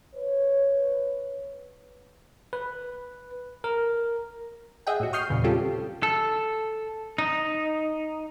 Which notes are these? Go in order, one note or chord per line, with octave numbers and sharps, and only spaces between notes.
B4 C#5
B4
A#4
G#4 D#5 E5 F#5 G5
A2 F#4
C#6 D#6 F6 G6 C7
E2 A#2 C#3
G3 C4 C#4 F4 G4 A4
A4
D#4